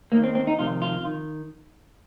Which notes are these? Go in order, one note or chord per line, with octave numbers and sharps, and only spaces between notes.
D#2 D#3 A#3
C4
C4
D#4
F2 C3 D#3 F4
F4
D#3